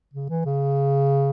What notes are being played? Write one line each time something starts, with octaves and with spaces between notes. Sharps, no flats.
C#3
E3
C#3